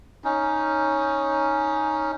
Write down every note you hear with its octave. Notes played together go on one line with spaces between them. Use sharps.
C#4 D#4